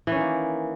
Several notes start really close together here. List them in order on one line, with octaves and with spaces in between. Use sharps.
E3 C#4 D#3 A#3